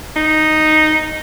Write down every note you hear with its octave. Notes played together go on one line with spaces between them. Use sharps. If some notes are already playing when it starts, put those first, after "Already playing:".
D#4